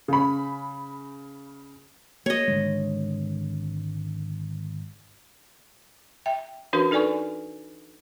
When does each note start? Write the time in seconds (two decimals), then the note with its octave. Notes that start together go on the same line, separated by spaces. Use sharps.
0.08 C#3 B5
2.26 A#3 C#5 D#5
2.48 G#1 D3 G#3
6.26 E5 G5
6.73 E3 C#4 D4 F#4 A#4 B4
6.91 D#4 A4 B4 D5 G#5 C#6